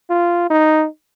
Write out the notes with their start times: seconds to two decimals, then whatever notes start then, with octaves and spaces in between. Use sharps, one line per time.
0.10 F4
0.50 D#4